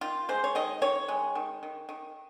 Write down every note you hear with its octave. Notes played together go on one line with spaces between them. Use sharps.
D#3 F4
G#3 C5
C#5
D#3 D#5
D#3 C#5
G#3
D#3
D#3
D#3